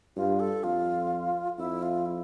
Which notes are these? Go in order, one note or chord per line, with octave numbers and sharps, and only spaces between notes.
G2 F4
A4
F2 F4
F2 E4
F4
E4